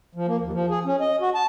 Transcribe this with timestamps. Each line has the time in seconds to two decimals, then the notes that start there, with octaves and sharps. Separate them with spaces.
0.15 F3
0.27 A#3
0.41 D#2
0.53 F3
0.70 G#4
0.85 C#4
1.00 D#5
1.21 F#4
1.35 A5